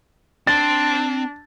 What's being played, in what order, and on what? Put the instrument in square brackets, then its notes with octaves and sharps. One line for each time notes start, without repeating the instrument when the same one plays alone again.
[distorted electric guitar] C4 C6 [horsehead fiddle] D4 [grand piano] A6